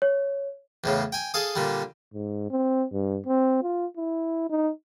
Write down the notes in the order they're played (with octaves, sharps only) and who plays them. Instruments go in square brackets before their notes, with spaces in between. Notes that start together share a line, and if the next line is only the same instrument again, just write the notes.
[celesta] C#5
[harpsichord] E2 A2 C#3
G5 G#5
G#4 A4 F5 D#6
A#2 D3 G3
[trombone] G#2
C4
G2
C4
F4
E4
D#4